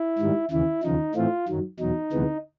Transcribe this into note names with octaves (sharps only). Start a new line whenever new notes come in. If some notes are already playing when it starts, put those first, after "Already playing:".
Already playing: E4
G#2 D#3 G3
D#2 C#3 E3 E4
D#2 C#3 F3 D#4
A2 E3 A3 C4 F4
F#2 D#3 F#3
E2 B2 F#3 D#4
D2 C3 E3 G#3 B3